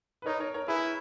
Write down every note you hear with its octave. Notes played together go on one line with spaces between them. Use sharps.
B4
D#4 A#4 C#5
A#4 C#5
A#4 C#5
E4 G#4 B4